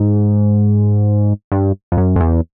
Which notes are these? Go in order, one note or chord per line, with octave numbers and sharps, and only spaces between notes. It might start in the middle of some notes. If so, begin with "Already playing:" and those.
Already playing: G#2
G2
F2
F#2
F2
E2